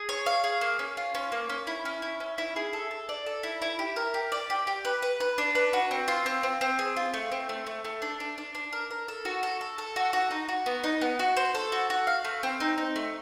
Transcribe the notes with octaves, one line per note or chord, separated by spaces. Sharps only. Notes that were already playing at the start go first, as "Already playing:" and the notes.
Already playing: G#4
C#5
F5
G#4
A#3
C#4
F4
C#4
A#3
C#4
E4
C#4
E4
C#4
E4
G#4
A4
A4
D5
A4
E4
E4
G4
A#4
G4
D5
G4
G4
B4
B4
B4
D4
B4
F#4
C4
F4
C4
C4
C4
G#4
F4
A3
C4
A3
A3
A3
D4
D4
D4
D4
A#4
A#4
A4
F#4
A4
A4
A4
F#4
F#4
D#4
F#4
B3
D#4
B3
F#4
C5
A4
F#4
F#4
F5
A3
C4
D#4
D#4
A3